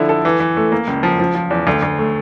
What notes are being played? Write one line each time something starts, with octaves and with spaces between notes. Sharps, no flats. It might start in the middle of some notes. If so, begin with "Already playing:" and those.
Already playing: D3 F3 E4
A4
E3
E3
A3
A#3
C#2
F3
F3
F3
E2
D2
D2
A3